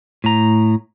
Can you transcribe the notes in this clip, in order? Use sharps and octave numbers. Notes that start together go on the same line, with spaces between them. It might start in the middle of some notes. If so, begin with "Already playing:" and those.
A2 A#5